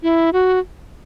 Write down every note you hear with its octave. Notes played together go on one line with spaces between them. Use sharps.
E4
F#4